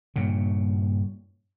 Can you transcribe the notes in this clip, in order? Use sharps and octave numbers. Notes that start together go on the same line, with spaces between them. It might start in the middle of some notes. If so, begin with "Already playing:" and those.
G2 A#2 C#3